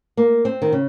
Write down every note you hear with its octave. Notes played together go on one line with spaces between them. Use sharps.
A#3
C4
D#3
C#3